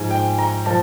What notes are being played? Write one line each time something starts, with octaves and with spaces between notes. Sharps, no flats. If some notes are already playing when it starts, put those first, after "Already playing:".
Already playing: G#2 F3 G#5
G5
A#5
F3 A5